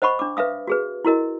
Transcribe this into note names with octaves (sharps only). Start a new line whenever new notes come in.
C5 D#5 F#5 B5 C#6
D4 D6
B4 E5 F5 D#6
F#4 G#4 B4
E4 F#4 A#4 D#5